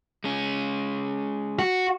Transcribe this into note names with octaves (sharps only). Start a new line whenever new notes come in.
G#3 C#4
F#4